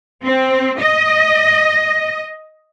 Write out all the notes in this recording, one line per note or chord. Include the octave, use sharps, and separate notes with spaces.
C4
D#5